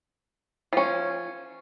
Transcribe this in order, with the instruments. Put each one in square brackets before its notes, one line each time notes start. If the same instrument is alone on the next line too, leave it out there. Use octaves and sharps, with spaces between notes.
[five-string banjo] F3 C#4